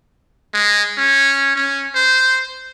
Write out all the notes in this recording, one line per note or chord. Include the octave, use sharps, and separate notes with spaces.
G#3
C#4
C#4
C5